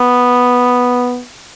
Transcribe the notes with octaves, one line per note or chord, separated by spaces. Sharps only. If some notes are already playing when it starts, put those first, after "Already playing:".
Already playing: B3